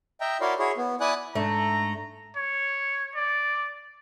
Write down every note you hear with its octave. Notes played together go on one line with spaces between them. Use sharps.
D#5 E5 G5 A#5
E4 F#4 A#4 C#5 D5 C6
E4 F#4 G#4 C#5
B3
E4 D5 G#5 D#6 F#6
G#2 A3 D4 A#5
C#5
D5